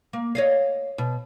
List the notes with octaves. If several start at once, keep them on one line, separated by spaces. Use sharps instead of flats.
A#3
C#5 D#5 F5
B2